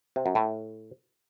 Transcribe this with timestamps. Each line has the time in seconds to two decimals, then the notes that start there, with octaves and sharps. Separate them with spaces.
0.16 C3
0.26 F#2
0.35 A2